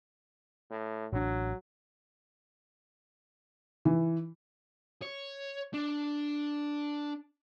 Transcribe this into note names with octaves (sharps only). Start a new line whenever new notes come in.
A2
A1 F#3 D4
E3
C#5
D4